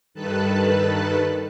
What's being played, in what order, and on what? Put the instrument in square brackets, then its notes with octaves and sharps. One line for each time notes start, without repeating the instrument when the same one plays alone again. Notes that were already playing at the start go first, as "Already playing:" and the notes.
[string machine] G2 D#3 A4 B4 A5 F#6